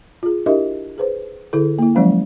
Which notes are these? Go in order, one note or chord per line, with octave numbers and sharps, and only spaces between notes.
F4 G#4
D4 E4 G4 A#4 D#5 E5
G#4 B4 C5
D3 E4 G#4 A4
A#3 E4
F3 F#3 G#3 C#4 C5 F5